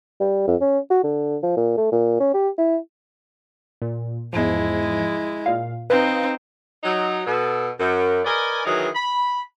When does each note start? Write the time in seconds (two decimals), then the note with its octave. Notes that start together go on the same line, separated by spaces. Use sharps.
0.20 G3
0.47 F2
0.61 C#4
0.90 F#4
1.04 D3
1.43 F3
1.57 A#2
1.77 A3
1.92 A#2
2.20 C#4
2.34 G4
2.58 E4
3.82 A#2
4.33 E2 G#2 F3 G#3 E4
5.46 A#2 F5
5.90 C4 D#4 B4 F5 D#6
6.83 F#3 D#4
7.26 B2 A4
7.79 F#2
8.25 A#4 B4 D5 D#5 G#5
8.66 D#3 E3 F#3 D#4 G#4 B4
8.95 B5